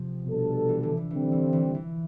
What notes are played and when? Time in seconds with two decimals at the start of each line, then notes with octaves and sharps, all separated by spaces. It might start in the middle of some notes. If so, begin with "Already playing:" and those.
Already playing: C3 F3
0.27 B2 G3 D4 A4
0.69 E3
0.83 D3
0.97 E3
1.11 D3 E3 G3 C4
1.32 E3
1.53 E3
1.74 E3